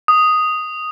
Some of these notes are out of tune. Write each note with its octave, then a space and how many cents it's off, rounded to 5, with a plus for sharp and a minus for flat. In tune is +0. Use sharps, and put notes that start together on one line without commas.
D#6 +0